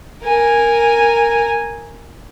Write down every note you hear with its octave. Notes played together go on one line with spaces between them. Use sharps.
A#4 G#5